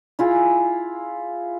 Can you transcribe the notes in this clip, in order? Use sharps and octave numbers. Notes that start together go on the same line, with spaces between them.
E4 F4 G#4